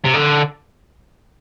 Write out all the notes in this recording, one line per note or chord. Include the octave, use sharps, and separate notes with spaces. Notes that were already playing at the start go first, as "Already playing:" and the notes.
C3
D3